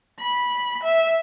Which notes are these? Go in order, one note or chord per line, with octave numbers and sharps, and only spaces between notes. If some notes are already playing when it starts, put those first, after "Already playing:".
B5
E5